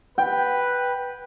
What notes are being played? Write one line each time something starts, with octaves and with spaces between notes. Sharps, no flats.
B4 G5